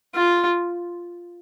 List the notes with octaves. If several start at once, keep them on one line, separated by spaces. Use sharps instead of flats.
F4